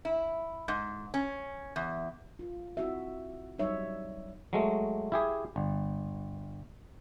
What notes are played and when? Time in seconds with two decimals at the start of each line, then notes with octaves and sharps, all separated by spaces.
0.05 E4
0.68 G#2
1.14 C#4
1.76 E2
2.39 F4
2.77 C4 E4 F#4 E5
3.58 F#3 G3 D#4 C#5 E5
4.53 F#3 G#3 A3
5.12 E4 G4 G#4
5.56 G1